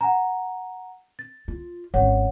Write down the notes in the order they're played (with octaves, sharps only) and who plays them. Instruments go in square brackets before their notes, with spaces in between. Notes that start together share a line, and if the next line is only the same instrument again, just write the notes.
[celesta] F#5 G#5 A#5
A6
[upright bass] F4
[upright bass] G#1 C#4 [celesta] C#5 F#5